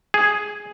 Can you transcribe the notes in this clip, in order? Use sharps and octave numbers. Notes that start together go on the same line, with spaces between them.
G#4